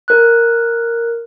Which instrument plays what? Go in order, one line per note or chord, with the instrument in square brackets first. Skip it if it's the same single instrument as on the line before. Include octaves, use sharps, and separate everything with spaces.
[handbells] A#4 F#6